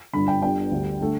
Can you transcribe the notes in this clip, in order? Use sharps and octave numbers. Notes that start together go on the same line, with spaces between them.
G1 G2 D3 B5
G5
G1 G2 G3 B3 D4 G5
D2 D3 G3
D3 A3